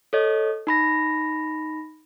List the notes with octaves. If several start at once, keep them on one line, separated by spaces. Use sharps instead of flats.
A4 C#5 D#5
D#4 B5 A#6